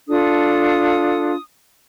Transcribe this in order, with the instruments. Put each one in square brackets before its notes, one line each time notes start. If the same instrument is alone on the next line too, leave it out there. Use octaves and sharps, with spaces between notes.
[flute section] D4 F4 A4 D#6